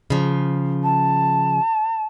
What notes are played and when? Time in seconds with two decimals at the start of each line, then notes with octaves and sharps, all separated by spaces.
0.10 C#3 F3
0.83 A5